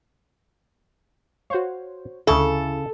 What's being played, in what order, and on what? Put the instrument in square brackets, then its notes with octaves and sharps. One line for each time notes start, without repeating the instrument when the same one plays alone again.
[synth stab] F#4 C5 C#5 [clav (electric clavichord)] F5
[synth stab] D2 E4 [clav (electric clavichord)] C#3 [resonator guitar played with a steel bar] A4